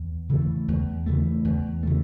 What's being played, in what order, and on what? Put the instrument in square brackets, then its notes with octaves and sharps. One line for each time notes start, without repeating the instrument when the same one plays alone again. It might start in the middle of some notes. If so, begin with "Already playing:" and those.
Already playing: [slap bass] E2
C#3 E3 A3
E2
C#3 E3 A3
E2
C#3 E3 A3